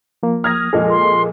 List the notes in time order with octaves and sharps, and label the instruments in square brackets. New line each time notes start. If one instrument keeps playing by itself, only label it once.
[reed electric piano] F3 A#3
[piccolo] D#6 [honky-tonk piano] F6 G#6 A#6
[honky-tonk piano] F2 A#2 G#3 [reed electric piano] G#4 A4 D#5
[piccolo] C6